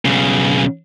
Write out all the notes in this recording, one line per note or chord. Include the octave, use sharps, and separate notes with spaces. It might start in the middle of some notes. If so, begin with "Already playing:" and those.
B1 C#3